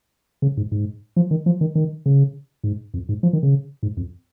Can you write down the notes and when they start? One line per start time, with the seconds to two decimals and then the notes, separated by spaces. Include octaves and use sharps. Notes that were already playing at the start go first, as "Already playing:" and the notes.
0.42 C#3
0.57 G#2
0.72 G#2
1.16 F3
1.31 D#3
1.46 F3
1.61 D#3
1.75 D#3
2.06 C#3
2.64 G#2
2.94 F2
3.09 G#2
3.23 F3
3.33 D#3
3.43 C#3
3.83 G#2
3.97 F2